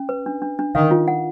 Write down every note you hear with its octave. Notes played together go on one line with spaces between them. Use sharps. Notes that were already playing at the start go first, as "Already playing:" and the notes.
Already playing: C#4
B4
D4
D4
D4
D#3 F5
F4
F#5